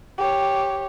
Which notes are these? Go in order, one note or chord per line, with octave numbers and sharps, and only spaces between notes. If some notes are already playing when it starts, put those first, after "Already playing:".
G4 C#5